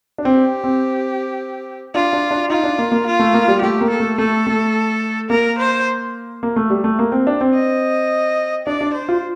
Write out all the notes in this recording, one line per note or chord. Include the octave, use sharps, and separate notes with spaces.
D4
C4 G4
C4
D4 F4
D4
D4
D#4 F4
D4
A#3
A#3
F4
A3
A#3
G3
A3 G4
A#3
A4
A3
A3 A4
A3
A#3 A#4
C5
A#3
A3
G3
A3
A#3
C4
D4
C4
D#5
D4 D5
D4
C5
F4